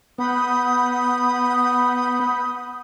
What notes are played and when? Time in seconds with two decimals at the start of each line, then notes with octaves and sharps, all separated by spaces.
0.18 B3 F#5 B5 D#6 G6